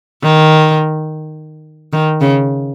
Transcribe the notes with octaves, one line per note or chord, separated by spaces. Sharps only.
D#3
D#3
C#3